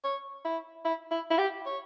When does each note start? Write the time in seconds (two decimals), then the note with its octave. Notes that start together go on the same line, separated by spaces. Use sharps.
0.04 C#5
0.45 E4
0.85 E4
1.11 E4
1.30 E4
1.38 G4
1.66 C#5